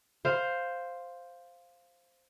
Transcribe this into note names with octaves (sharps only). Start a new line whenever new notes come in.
C5 F5